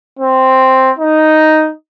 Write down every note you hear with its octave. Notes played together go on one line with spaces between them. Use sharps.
C4
D#4